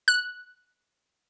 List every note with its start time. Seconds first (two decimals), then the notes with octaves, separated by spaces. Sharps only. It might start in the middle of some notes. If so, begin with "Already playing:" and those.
0.08 F#6